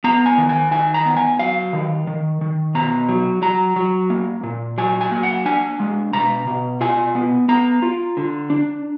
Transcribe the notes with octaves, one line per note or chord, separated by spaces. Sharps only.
B3 A#5
G#5
D#3
G#5
D#3 G#5
A#5
B3
G#5
F#3 F5
D#3
D#3
D#3
B2 A#5
F#3
F#3 A#5
F#3
A#3
A#2
F#3 G#5
G#5
A#3
F#5
D4 G#5
G#3
B2 A#5
B2
F4 G#5
B3
B3 A#5
F4
D3
D4